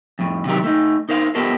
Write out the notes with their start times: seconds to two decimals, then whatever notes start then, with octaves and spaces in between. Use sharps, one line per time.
0.19 F2 A2
0.45 C3 D#3 E3 F#3 G4 A#4
0.64 A3 D#4
1.09 D#4 A#4 C5 F5
1.35 B3 F4 G4 A4 A#4 C5